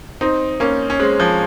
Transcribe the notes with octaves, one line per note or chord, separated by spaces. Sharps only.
C4 D#4
A#3 C#4
C#4
G#3 C4
F3 G#3